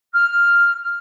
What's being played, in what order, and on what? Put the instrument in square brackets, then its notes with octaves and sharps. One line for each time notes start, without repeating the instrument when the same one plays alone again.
[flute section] F6